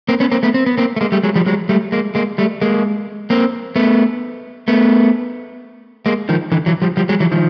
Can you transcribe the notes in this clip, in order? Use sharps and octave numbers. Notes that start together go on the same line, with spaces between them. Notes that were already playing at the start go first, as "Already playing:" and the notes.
A#3 C4
B3 C#4
A#3 C4
A3 B3
C4
B3
A#3 C4
A3
G#3 A#3
G3 A3
F#3 G#3
F3 G3
F#3 G#3
G3 A3
G#3 A#3
G#3 A#3
G3 A3
G#3 A#3
A#3 C4
A3 B3
A3 B3
G#3 A#3
D#3 F3
D3 E3
E3 F#3
F3 G3
F3 G3
F#3 G#3
E3 F#3
D#3 F3